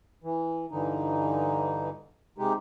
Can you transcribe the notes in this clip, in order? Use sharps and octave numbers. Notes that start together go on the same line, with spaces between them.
E3
G2 D3 E3 D#4
C3 G#3 D#4 G4